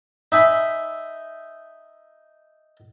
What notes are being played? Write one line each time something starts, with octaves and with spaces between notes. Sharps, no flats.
D#4 E5 G#5 B5